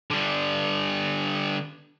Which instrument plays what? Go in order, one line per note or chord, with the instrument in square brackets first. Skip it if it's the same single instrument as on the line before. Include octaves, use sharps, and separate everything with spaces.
[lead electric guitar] D3 G3